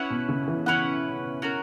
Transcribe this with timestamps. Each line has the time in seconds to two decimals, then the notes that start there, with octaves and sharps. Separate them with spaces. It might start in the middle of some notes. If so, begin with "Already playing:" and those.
Already playing: C#4 E4 B4 F#5
0.10 B2
0.29 C#3
0.48 E3
0.66 E3 C#4 E4 B4 F#5
1.42 C#4 F#4 A#4